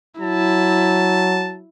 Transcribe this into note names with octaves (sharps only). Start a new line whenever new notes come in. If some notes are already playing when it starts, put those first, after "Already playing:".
F#3 E4 A5